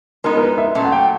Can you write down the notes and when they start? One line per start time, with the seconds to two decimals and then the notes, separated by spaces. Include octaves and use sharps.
0.24 G#3 B3 D#4 F#4 A#4
0.37 A#4
0.41 B4
0.58 E5
0.75 A#2 F#3 A3 C#4
0.85 F#5
0.92 G5